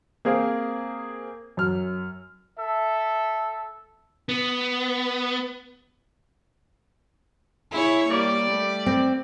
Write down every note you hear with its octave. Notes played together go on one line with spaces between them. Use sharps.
A#3 C4 G#4 C5 F5
F#2 F6
A4 E5
B3
E4 G#4 C#5
G3 A#3 G4 D5
A3
C4